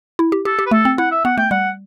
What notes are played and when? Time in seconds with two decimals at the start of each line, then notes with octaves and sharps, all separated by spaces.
0.19 E4
0.32 G4
0.45 G4 A4
0.59 G4
0.66 B4
0.71 A3 A4
0.85 C4
0.98 E4 F#5
1.11 E5
1.24 B3 F#5
1.38 A3 G5
1.51 G3 F#5